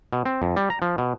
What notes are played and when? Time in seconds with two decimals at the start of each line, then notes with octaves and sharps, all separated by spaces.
0.13 B2
0.25 C4
0.42 F2
0.56 G3
0.70 A#5
0.82 F3
0.98 B2